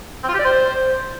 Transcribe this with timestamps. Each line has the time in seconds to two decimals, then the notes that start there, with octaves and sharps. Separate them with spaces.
0.24 C4
0.29 F4
0.34 G4
0.39 D5
0.44 C5